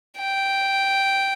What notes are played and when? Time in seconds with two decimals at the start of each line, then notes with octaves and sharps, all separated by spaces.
0.18 G5